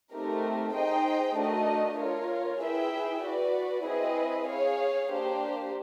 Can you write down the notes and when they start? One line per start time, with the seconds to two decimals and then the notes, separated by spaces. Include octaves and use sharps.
0.13 A3 C4 D#4 G4 A#4
0.75 D#4 G#4 C5 D#5 G5
1.37 A3 D4 F#4 A#4 D#5
1.99 F4 A#4 C#5
2.61 E4 G#4 B4 E5 G5
3.23 F#4 B4 D5
3.85 C4 E4 G#4 B4 D#5
4.47 G#4 C#5 F5
5.10 A#3 D4 G4 C5